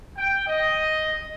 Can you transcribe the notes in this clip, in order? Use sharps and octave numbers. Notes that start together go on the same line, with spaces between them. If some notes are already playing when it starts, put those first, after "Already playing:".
G5
D#5